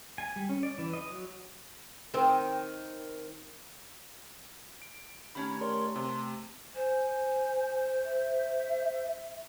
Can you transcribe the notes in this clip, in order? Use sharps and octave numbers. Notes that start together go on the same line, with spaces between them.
G#5
G3
C#4
D5
E3
D#5
F#3
D#3 C4
D7
D#3 A3 C#4 G4 B5 G#6
A#4 C#5 D5 C6
C3 C6
C5 G#5
E5